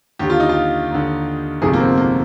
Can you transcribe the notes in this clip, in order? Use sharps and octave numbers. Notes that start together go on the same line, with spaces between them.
D#2 D3 G4
F4
D#4
F4
D#2 D3
G1 F2 C3 D#3 G#4
A#3
C4
A#3